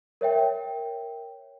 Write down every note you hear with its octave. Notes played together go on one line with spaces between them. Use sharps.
A#4 C#5 E5 G5